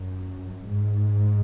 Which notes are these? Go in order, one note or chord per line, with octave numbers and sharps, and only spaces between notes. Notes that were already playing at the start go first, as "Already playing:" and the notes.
Already playing: F#2
G#2